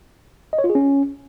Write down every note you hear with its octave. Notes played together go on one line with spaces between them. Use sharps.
D#5
C#5
F4
G#4
C#4